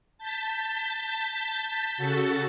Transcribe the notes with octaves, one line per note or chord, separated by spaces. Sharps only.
A5 G6 A6 B6
C#3 F#4 A4 A6